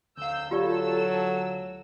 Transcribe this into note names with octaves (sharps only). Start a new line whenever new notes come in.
D2 F5 E6 G6
F#3 F4 G4 A4 D5 E6